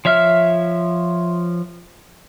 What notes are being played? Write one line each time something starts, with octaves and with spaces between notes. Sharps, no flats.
F3 C#5 E5 F6